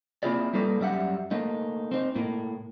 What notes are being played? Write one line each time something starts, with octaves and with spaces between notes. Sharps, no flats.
A#3 C4 E4 F4 G#4 D5
G3 A#3 D#4 A4 B4 D5
F#2 G3 E5 F#5
A3 A#3 D#4
C4 D#4
A2 A#3